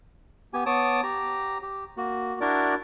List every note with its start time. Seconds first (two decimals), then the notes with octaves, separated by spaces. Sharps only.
0.53 B3 G4 G#5
0.66 B3 C#5 A5 D6 D#6
1.03 G4 A#5
1.63 G4
1.97 A#3 F#4
2.41 D4 E4 F#4 A#4 D5